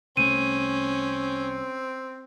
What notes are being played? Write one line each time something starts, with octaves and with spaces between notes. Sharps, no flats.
C2 A3 C4 C#4 D#7